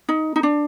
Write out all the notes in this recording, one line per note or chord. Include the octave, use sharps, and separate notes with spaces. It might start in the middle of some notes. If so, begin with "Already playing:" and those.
D#4
D#4
D4